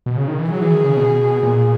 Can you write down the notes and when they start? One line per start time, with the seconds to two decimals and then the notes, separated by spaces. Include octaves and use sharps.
0.06 B2
0.17 C#3
0.28 D#3
0.38 E3
0.50 F#3 G#4
0.61 E3
0.73 D#3
0.84 C#3
0.97 B2
1.43 A#2